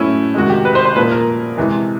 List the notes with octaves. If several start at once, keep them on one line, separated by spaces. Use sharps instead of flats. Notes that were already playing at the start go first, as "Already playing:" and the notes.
Already playing: A2 F#3 A3 C#4 E4
C3 D#3 G#3 F#4
G4
B4
C5
C5
A#2 F3 A#3 B4
A#4
C3 E3 G#3